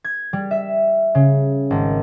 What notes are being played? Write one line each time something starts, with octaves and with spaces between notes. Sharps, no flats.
G#6
G3
E5
C#3
G#1